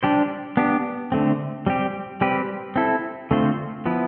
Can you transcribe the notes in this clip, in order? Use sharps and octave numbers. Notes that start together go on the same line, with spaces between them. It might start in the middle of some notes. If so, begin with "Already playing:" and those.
G3 D4 G4 C5
B3 D4 G4
D3 A3 C4
G3 C4 G4
G3 C4 G4 B4
C4 E4 A4
D3 A3 C4 F4 C5
F3 B3 E4